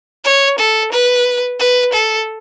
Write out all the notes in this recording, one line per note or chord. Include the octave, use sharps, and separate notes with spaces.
C#5
A4
B4
B4
A4